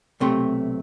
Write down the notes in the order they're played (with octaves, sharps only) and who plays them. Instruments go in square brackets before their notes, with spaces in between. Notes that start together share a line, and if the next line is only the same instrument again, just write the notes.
[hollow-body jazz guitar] B1 C3 A3 C6